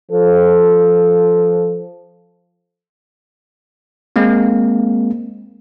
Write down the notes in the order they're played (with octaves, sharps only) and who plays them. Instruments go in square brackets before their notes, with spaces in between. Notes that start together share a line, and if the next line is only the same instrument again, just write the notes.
[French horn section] F3 A4
[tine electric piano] G#3 A#3 C4